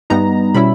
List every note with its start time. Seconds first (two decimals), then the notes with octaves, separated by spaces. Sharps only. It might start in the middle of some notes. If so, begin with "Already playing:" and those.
0.10 G2 G3 B3 D#4 A#5
0.54 B2 G3 C#4 E4 B5